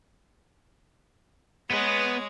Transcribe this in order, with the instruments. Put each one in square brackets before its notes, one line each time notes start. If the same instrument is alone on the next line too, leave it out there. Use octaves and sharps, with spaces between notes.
[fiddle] G#3 C#5 [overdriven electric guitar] B3 B4